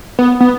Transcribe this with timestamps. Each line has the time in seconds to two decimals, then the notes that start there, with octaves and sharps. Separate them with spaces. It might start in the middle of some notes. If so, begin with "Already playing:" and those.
0.19 B3
0.41 B3